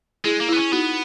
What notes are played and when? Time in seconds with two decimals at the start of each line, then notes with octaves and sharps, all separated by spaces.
0.25 G#3 E4 G#4
0.41 A#3
0.49 B3 E4
0.57 C#4
0.72 B3 D#4 F#4